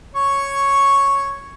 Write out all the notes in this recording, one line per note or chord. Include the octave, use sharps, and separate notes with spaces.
C#5 C#6